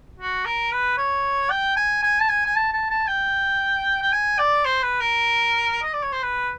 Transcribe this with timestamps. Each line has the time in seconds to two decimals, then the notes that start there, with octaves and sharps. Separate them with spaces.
0.20 F#4
0.45 A#4
0.72 B4
0.98 C#5
1.50 G5
1.77 G#5
2.03 G#5
2.20 A5
2.29 G#5
2.46 G#5
2.56 A5
2.73 A5
2.90 A5
3.07 G5
4.02 G5
4.12 G#5
4.38 D5
4.65 C5
4.83 B4
5.00 A#4
5.82 D#5
5.93 D5
6.03 C#5
6.13 C5
6.23 B4